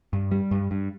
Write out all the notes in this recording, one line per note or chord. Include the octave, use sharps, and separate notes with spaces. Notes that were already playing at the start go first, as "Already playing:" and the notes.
G2
G3
G2
G2